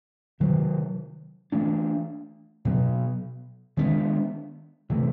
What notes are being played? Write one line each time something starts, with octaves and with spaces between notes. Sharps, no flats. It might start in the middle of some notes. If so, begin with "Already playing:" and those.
C3 D#3 F#3
E3 A3 D4
B2 F#3 B3
D#3 G#3 B3 D4
C3 E3 A3